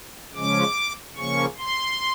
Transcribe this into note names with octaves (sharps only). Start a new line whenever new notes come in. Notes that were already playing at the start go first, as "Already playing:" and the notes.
C#3 F3 G#3 C#4 D6
C#3 F3 A#3 C#4 C#6
C6